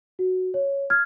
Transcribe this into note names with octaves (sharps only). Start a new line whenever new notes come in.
F#4
C#5
F6 G#6